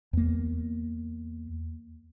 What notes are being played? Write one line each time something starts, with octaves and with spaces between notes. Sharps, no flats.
E2 A#3